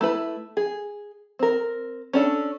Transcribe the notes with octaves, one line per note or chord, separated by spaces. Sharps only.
A3 E4 B4
G#4
C4 A#4
C#4 D4 A4